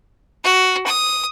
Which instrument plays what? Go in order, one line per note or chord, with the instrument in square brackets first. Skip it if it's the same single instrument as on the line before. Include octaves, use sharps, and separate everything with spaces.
[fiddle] F#4
D#6